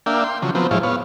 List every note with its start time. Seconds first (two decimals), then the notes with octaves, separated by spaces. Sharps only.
0.06 A#3 D4 E5 F5 G5
0.24 G5 C6
0.42 C#3 F3 F#3
0.55 F3 F#3 B3 C4
0.71 A2 F3 G#3 E4 C#5 F5
0.83 B3 C#5 F5